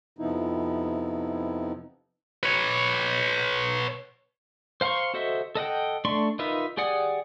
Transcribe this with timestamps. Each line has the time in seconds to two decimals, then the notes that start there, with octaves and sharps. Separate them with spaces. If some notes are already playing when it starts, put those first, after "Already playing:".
0.19 F2 C3 F3 B3 D#4 E4
2.43 B4 C#5
4.81 C5 F5 A#5 C6 C#6
5.14 F#4 A4 C5 D#5 E5
5.55 A4 D#5 F#5 G5
6.05 A3 D4 D5 C6 C#6
6.39 D#4 F4 A#4 B4 E5
6.77 G4 G#4 D5 F#5 D#6